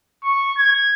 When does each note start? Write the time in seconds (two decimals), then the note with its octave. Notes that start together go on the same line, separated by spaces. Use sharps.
0.24 C#6
0.57 G#6